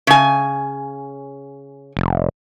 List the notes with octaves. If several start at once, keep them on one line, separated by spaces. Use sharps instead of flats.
C#3 G#5
F1